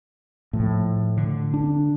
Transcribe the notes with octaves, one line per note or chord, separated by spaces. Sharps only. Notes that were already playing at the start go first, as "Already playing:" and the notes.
A2 F3
D3
D4